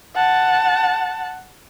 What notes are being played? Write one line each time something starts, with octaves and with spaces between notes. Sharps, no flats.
F#5 A5